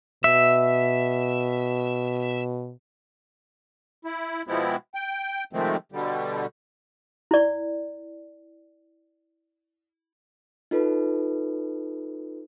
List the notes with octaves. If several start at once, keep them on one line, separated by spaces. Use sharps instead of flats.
B2 E5
E4
B2 F3 G#3 B3 C4 E4
G5
C3 D#3 F3 G#3 A3 C4
B2 D3 G3
E4 D5
D#4 F4 A4 B4